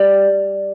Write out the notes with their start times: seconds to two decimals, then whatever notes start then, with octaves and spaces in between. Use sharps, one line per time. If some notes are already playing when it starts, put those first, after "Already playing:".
Already playing: G3